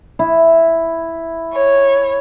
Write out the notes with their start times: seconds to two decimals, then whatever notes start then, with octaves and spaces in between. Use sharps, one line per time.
0.19 E4
1.53 C#5